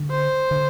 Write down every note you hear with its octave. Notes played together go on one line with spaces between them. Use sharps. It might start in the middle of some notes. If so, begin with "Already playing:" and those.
Already playing: D3
C5
D3